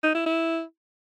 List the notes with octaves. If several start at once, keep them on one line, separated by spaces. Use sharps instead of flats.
D#4
E4
E4